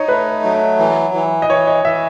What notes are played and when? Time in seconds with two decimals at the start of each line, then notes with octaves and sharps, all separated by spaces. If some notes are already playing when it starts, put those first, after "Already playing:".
Already playing: D#4 C#5 D#5
0.08 A3 B4
0.44 F#3
0.79 E3
1.14 E3
1.42 D#5
1.50 E3 C#5
1.67 D#5
1.85 E3 E5